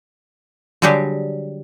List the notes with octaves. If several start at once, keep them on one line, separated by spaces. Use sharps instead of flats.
D3 F#3 G3 G4 G#4